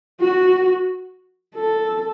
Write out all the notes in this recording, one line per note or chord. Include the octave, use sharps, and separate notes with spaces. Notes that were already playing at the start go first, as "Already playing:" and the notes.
F#4
A4